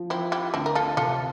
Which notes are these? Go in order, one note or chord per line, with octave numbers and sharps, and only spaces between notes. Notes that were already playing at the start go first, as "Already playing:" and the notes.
Already playing: F3
F3 C4 E4
E4 G4
D2 C4 E4
A#4
F4 A4
C3 F4 A4